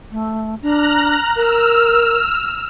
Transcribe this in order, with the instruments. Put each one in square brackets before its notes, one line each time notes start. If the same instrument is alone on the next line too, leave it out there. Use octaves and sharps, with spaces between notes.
[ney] A3
[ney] D4 [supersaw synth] A#5 F6 F#6
[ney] A#4 [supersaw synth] E6 F6